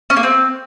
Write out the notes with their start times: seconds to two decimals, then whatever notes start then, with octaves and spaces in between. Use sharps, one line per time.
0.10 C#4
0.17 A#3
0.23 C4